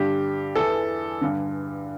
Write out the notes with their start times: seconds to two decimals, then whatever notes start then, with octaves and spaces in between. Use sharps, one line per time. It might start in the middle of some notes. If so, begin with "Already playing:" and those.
Already playing: G2 D3 G4
0.55 E2 E3 A4
1.21 G2 D3